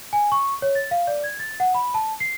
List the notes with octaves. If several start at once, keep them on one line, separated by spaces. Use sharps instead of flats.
G#5
C#6
C#5
A6
F5
D5
G#6
A6
F#5
B5
A5
C7